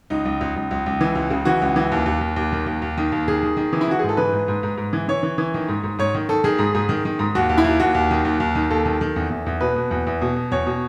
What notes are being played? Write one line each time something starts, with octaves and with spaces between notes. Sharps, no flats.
C#2 D#4
C#2
C#2
C#2
C#2
C#2
E3
C#2
C#3
E3 F#4
C#2
E3
D#2
D#2
D#2
D#2
D#3
D#2
D#2
D#3
D#2
D#3 G#4
D#3
D#3
E3
E4
E3 F#4
G#2 G#4
A4
E3 B4
G#2
G#2
G#2
G#2
E3
E3 C#5
E3
E3
D#3
G#2
G#2
G#2 C#5
D#3
D#3 A4
D#3 G#4
G#2
G#2
D#3
D#3
G#2
D#2 F#4
D#2
E4
D#2
D#2 F#4
D#2
D#3
D#2
D#2
D#3
D#2 A4
D#3
D#3
E2
E2
E2
B2 B4
B2
E2
E2
B2
B2
E2 C#5
B2